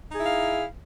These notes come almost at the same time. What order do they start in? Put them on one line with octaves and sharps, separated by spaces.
D#4 G#4 E4 F5